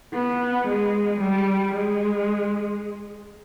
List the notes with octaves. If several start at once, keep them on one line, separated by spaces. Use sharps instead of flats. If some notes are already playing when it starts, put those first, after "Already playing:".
B3
G#3
G3
G#3